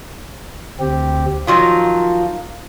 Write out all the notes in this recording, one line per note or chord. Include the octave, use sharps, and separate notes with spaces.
D2 C4 G4
D#3 F3 F#3 F4